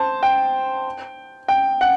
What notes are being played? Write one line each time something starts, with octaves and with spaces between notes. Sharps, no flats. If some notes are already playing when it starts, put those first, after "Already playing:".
Already playing: C5 A5
G5
G5
F#5